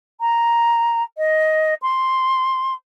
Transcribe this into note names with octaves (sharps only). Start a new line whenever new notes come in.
A#5
D#5
C6